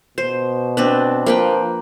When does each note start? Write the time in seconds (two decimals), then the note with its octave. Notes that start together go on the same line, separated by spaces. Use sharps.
0.18 B2 C5
0.77 C4 D4 B4
1.26 F3 A#3 B4 G5